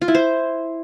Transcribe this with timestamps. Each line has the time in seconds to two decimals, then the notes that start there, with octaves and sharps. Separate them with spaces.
0.02 F4
0.08 E4
0.15 C5